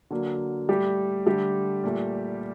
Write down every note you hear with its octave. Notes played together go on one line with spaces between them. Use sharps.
D3 F#3 A#3
A2 G3 A3 G4
D3 G3 A3 G4
A#2 A3